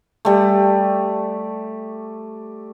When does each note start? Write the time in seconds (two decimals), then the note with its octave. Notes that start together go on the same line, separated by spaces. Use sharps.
0.25 G3 A3